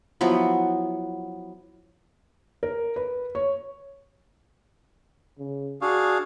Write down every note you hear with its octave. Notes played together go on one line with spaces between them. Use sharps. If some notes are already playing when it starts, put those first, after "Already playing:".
F3 F#3 B3 E4
A#4
B4
C#5
C#3
D4 F#4 G#4 F5 C#6